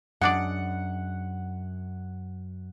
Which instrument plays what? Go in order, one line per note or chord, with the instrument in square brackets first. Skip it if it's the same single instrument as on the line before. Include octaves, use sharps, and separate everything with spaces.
[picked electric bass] F#2 [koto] G#3 D4 D5 [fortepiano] F#5